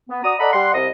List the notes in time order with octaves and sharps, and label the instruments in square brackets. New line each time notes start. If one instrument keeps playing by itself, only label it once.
[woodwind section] B3
F#4 D5 A#5 D#6
A4 D5 D#5 F#5 A#5 B5
G3 F#5 C6
C2 D#5